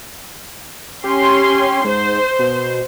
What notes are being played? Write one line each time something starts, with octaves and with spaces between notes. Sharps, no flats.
C#4 G4 C6
G#2 C5
B2